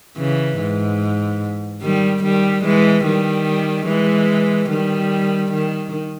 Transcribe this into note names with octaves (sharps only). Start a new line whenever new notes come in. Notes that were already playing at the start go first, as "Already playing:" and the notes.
C#3 E3
G#2
D#3 G3
D#3 G3
E3 G#3
D#3 G3
E3 G#3
D#3 G3
D#3